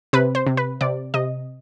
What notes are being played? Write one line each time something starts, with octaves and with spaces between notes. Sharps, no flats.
C3 B4
C5
C3
B4
C3 D5
C3 D#5